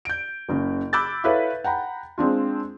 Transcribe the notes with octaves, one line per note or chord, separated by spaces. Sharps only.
G6 D7
F#1 C#3
B5 D6 E6 F#6 G6 A6
E4 A4 B4 C#5 E5 F5
F#5 G5 A#5 B5
G#3 C4 D4 F4